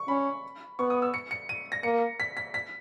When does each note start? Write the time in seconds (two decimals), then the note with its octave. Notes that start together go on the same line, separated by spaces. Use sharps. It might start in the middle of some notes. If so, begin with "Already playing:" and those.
Already playing: C#6
0.08 C#4 B5
0.79 B3 C#6
0.90 D#6
1.02 E6
1.14 C#7
1.31 C#7
1.49 D#7
1.72 A#6
1.83 A#3 C#7
2.20 B6
2.37 B6
2.54 B6